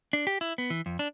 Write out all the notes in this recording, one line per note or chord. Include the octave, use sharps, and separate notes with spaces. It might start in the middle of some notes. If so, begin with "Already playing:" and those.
D4
G4
E4
B3
E3
F2
D4